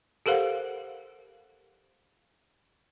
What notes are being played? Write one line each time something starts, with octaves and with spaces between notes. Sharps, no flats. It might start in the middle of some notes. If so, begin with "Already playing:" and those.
G4 A4 A#4 C5 F5 F#5